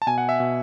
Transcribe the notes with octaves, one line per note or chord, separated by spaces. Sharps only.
A5
B2 G#5
F#5
E5
B2